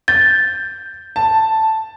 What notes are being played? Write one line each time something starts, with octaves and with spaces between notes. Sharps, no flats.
G6 A6
A5